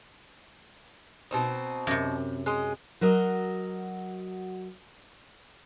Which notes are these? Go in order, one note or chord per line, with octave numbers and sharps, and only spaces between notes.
B2 C4 D#4
F#2 C3
G#3 D#5
F#3 F#4 A#4 D#5